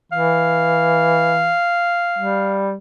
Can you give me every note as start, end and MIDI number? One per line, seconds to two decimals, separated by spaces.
0.12 1.54 52
0.12 2.65 77
2.19 2.75 55